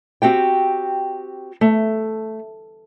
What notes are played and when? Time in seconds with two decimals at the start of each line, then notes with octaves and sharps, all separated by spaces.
0.22 C4 F#4 G4 G5
1.61 A3